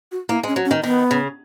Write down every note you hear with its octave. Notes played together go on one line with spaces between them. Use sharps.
F#4
A#3 E4
G#3 C#4
F#3
C#4
D#3
D#3 B3
C#3